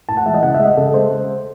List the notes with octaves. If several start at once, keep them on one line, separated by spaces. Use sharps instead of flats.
A2 A5
F#5
E3 G#3 E5
D#5
C#3 F#5
E5
G#3
D#5
C#3 A4
G#3 C5